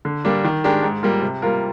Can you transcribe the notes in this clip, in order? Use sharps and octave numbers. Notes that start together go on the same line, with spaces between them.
D3
G3 A#3 D4
D#3
G#3 D4 G4 A#4
G#2
G3 A#3 F4
C3
G3 A#3 F4 A#4